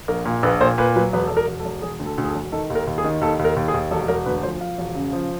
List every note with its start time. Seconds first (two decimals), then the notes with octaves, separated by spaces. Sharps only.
0.08 A#1 A#4
0.25 A#2
0.43 A#1 B4
0.61 A#2 C5
0.78 A#2 B4
0.96 F#3 B4
1.13 E1 B4
1.26 E1 A4
1.37 A#4
1.47 E1
1.59 A4
1.65 E1
1.82 E1 G#4
2.00 D2
2.06 A4
2.18 D2
2.24 G#4
2.29 A4
2.35 E1
2.52 D#3 A4
2.70 D#2
2.75 A#4
2.87 D#2
2.98 G#4
3.04 D#3
3.21 D#2 A4
3.39 D#2
3.44 A#4
3.56 D#2
3.68 G#4
3.74 D#2
3.91 E1 A4
4.08 E1 A#4
4.26 D2 B4
4.43 F3 C5
4.61 F3 F5
4.78 E1
4.95 C#3
5.13 F3